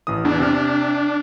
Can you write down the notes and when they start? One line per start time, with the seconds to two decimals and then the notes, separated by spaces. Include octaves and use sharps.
0.07 A1 E3 D#6
0.25 E2 D4
0.39 C3 F6